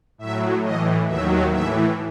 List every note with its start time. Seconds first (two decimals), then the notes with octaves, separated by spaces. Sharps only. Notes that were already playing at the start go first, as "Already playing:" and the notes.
0.18 A2 F#3 E5
0.62 A2 E3 D#5
1.06 D#2 D#3 F#3 E5
1.50 A2 E3 E5